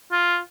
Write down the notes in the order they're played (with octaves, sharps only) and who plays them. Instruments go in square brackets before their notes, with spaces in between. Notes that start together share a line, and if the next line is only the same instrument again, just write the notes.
[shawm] F4